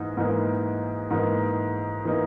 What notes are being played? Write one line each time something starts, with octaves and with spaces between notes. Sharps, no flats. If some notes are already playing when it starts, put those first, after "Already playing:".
Already playing: G#2 E3 A#3 D#4
G#2 E3 A#3 D#4
G#2 E3 A#3 D#4
E3 A#3 D#4